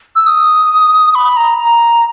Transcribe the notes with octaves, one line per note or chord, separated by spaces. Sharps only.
E6
D#6
B5
A#5
A#5